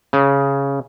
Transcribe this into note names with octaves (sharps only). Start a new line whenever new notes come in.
C#3